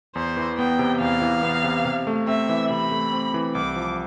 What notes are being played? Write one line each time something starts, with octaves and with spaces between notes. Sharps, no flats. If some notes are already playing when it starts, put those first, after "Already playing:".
E2 C5
E3
B3 G5
C3
E2 F5
E3
B3
C3
C3
A3
C4 E5
E3
C3 B5
A3
C4
E3
C2 D6
F3